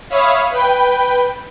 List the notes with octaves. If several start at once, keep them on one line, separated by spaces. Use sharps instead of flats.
C#5 E5 F5 B5 D#6
B4 G5